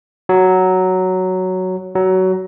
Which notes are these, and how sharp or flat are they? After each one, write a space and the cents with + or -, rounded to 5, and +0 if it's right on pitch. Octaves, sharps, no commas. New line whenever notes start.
F#3 +5
F#3 +20